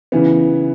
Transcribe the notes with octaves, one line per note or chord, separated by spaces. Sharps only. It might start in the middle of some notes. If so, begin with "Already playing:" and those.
C#3 E3 B3